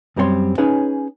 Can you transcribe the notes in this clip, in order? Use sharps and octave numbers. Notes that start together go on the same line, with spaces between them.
F#2 G3 C4 A4 C#5 C6
C#4 D#4 G#4 B4 C#5